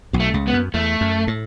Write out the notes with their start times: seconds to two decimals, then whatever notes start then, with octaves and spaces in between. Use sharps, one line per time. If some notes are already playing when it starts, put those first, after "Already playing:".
0.13 B1 B2
0.20 A3
0.34 C#2 C#3
0.48 B3
0.53 F#2
0.74 E2 A3
1.01 F#2
1.27 A2